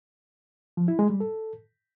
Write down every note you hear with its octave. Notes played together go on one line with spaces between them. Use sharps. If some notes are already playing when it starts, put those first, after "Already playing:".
F3
E4
G#3
G3
A4